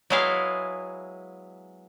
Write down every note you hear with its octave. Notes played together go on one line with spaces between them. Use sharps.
F#3 G#3 B3 E4 G#4 F5